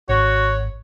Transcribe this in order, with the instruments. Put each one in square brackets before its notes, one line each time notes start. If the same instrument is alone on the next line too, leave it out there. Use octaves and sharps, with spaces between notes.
[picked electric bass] G#1 [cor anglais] F#4 [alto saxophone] C#5